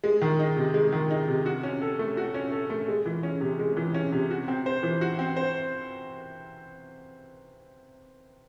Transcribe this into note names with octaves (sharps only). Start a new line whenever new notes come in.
G#3
D#3
D#4
C3
G#3
D#3
D#4
C3
F#4
C#4
A4
A3
F#4
C#4
A4
A3
G#3
E3
C#4
C3
G#3
E3
C#4
C3
F#4
C4
C5
E3
F#4
C4
C5